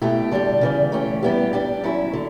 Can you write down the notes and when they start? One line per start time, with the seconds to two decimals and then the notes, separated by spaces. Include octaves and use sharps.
0.02 B2 A3 E4 G4
0.31 D3 G3 D4 G4
0.61 C#3 E3 G3
0.92 E3 A3 C#4 G4
1.23 G3 B3 E4 G4
1.53 G3 D4 G4
1.84 F#3 C#4 E4
2.13 D3